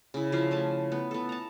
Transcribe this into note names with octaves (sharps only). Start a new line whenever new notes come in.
C#3 E4
F3 C#4 E4 F5
A3 G#5 A5
B3
B3 A4
A5 A#5